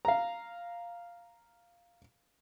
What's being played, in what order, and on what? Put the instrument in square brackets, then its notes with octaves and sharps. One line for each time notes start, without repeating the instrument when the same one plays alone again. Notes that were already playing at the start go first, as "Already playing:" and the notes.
[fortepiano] F5 A#5